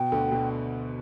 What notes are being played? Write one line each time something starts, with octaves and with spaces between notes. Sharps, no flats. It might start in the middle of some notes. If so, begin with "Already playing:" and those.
Already playing: B2 G5
D2 D3
B2